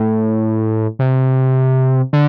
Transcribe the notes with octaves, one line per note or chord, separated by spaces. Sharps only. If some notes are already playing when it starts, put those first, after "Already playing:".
Already playing: A2
C3
D3